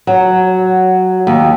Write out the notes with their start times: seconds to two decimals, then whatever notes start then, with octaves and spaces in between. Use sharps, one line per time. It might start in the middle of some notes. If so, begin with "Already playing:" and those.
0.07 F#3
1.27 D#2